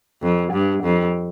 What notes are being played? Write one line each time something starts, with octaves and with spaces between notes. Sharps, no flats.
F2
G2
F2